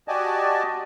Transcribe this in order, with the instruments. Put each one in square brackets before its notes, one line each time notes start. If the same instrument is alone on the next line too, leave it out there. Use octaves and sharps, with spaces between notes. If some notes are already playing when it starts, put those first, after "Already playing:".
[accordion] F#4 G4 D5 D#5 G#5 A5